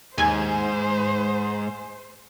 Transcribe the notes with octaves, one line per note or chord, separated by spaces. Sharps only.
D#2 G#2 C5 G#5